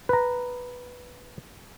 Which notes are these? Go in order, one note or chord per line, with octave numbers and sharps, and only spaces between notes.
B4 A#5